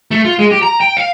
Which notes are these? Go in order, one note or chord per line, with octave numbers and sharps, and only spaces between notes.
A3
F4
G#3
G4
A#5
G5
F5